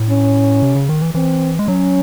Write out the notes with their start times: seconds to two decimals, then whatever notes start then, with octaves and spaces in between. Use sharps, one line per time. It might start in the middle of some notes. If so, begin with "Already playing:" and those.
Already playing: A2
0.10 C#4
0.62 C3
0.75 C#3
0.89 D#3
1.01 E3
1.15 E3 C4
1.59 G#3
1.68 F#3 C#4